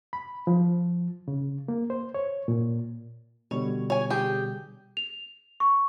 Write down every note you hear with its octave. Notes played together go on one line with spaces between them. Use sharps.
B5
F3
C#3
A#3
C5
C#5
A#2
B2 D3 G3 C#5
C#5 G#5
G4 G#4
F7
C#6